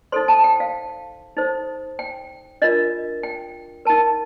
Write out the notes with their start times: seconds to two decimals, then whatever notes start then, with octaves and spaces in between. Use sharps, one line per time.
0.12 D#4 A4 C5 C6
0.28 A5
0.44 G5
0.60 F5
1.37 D#4 A4 C5
1.99 G5
2.62 D4 F4 A#4 D#5
3.23 G5
3.85 D#4 A#4 A5